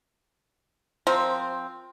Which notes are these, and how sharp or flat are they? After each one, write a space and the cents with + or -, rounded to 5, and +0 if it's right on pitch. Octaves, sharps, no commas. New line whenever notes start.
F3 +10 C4 +0 A#4 +10